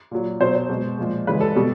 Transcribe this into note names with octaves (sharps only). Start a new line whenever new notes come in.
A#2 F#3
B2 F#3 C5
C5
B2 G#3
A#2 F3 G#3
C#3 E3 G#3 B4
A4
B2 G3